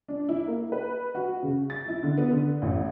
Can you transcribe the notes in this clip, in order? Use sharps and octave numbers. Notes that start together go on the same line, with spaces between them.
D4
E4
A#3
B4
F#4
C#3
A6
E4
D3
B3
D3
A1